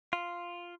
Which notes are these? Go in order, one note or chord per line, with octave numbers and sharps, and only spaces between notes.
F4